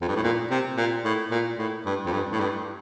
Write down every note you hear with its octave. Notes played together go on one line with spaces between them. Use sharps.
F2
G2
A2
A#2
C3
A#2
A2
A#2
A2
G2
F2
G2
A2
G2